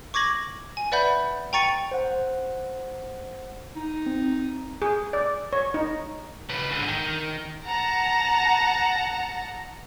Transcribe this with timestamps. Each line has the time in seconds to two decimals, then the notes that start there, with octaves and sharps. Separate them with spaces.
0.14 C#6 D6 G#6 A#6 F#7
0.77 G#5
0.92 B4 D5 E5 F#5 B5 G6
1.53 G5 A#5 C#6 A6 C#7 D#7
1.92 C5 F#5
3.76 D#4
4.06 C4
4.82 G#4
5.13 D5
5.53 C#5
5.74 D#4
6.49 C#3 B4
6.71 G#2 D3
6.88 D#3
7.65 F#5 A5 A#5